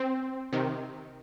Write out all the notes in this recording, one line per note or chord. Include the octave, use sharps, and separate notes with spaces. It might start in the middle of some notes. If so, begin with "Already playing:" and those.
Already playing: C4
C3 D#3